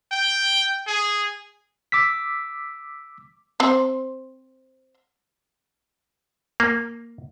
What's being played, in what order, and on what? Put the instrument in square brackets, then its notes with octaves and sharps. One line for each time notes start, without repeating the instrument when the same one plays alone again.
[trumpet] G5
G#4
[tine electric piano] D6 E6 B6
[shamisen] C4 C5
[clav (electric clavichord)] A#3